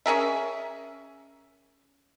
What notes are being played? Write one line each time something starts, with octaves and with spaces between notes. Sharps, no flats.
C#4 G#4 A#4 E5